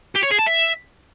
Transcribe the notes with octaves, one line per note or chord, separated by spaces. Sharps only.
G4
C#5
G#4
A5
E5